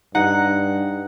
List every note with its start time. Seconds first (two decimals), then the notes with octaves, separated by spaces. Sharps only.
0.15 G2 D#4 F#5